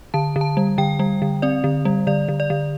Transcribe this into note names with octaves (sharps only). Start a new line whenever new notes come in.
D3 A5
D3
A5
G3
D3 G5
G3
D3
C4 D5
D3
G3
D3 D5
D3
D5
D3